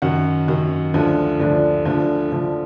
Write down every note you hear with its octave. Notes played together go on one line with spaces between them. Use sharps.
F#2 D#3 F#3 F#5
F#2 D#3 F#3
D2 D3 F3
D2 D3 F3 D5
D2 D3 F3
D2 D3 F3